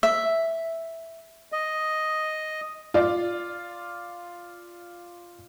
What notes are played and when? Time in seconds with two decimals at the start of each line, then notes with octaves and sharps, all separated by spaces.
0.03 E5
1.52 D#5
2.94 F4 D5